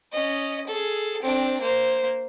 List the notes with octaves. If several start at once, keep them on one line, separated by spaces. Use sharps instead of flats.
C#4 D#5
G#4 A4
C4 D4
A#3 C5